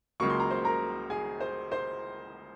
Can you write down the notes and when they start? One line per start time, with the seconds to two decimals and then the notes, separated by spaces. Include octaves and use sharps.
0.20 C#2 C#3 F#3 A#3 C#6
0.30 C6
0.40 A#5
0.51 C5 C6
0.65 A#4 A#5
1.10 G#4 G#5
1.41 C5 C6
1.72 C5 C6